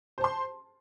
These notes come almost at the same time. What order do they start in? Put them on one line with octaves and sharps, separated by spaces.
C5 A5 C6